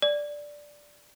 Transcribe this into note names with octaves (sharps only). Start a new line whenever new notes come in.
D5